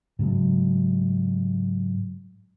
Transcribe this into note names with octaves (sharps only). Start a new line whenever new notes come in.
G#2 C#3 F#3 G#3